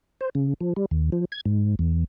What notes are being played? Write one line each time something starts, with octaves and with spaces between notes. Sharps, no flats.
C5
C#3
F3
G3
D#2
F3
G#6
G#2
E2